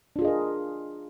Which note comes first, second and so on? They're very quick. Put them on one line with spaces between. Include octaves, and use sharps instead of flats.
D4 F4 G#4 D#5 A#4